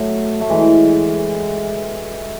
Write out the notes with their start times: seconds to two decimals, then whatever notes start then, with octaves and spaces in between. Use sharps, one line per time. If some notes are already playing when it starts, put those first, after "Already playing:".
Already playing: F#3 A3
0.41 A3
0.50 E3 G#3